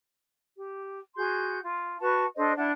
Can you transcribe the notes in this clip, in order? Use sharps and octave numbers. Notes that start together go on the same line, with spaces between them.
G4
F#4 G#4 C6 G6
F4
F#4 B4 A5 C#6
D4 A4 C5 D#5
D4 E4 F#5 A5